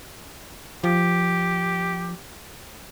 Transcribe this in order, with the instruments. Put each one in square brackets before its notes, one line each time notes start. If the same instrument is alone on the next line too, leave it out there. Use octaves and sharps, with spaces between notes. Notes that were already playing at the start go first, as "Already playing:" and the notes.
[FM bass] F3 [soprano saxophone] G4